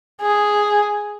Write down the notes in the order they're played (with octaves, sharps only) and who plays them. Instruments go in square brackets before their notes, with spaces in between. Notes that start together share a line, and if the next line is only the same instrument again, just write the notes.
[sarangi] G#4